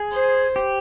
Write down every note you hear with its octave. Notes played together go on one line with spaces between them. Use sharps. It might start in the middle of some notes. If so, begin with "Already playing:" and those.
Already playing: G#4
C5
G4